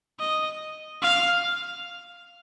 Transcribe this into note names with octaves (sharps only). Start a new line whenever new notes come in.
D#5
F5